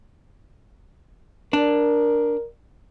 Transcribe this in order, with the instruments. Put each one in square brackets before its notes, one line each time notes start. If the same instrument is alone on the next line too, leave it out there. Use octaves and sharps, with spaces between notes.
[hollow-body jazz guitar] D4 [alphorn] A#4